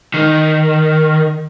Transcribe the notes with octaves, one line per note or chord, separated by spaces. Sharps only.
D#3